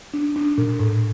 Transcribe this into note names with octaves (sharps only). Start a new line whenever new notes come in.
D4
D4
A#2
A2